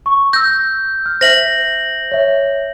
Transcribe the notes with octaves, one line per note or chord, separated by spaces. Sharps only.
C#6
E6 G6 A#6
F6
C5 E5 A#6 B6 F#7
C#5 E5